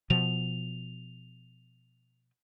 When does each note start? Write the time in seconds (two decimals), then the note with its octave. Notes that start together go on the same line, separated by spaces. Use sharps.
0.10 B2 F3 F7